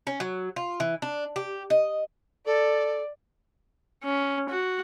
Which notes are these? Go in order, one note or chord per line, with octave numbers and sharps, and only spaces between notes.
C#4
F#3
F4
E3
D4
G4
D#5
A4 D5
C#4
F#4